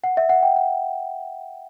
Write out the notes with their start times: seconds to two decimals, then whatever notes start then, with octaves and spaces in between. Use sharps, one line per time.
0.04 F#5
0.17 E5
0.29 F#5
0.43 G5
0.56 F#5